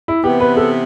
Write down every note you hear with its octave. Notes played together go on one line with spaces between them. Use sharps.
E4
C3 E3 B3 G4
B4
A4